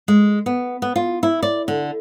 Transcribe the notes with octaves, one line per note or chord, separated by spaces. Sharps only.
G#3
B3
B3
F4
E4
D5
D3